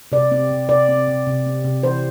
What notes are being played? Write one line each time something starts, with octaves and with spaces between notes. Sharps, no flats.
C3 D5
C4
C3
C3 D5
C4
C3
C3
C4
C3
E3 C5